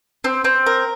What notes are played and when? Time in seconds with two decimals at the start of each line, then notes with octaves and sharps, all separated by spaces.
0.24 C4
0.44 C4
0.66 A#4